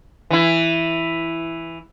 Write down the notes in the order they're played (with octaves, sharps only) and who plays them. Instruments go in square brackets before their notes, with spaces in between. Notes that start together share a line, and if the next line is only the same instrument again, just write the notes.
[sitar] E3 E4